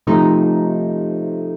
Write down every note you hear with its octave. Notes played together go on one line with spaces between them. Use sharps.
C3 F3 A3 D#4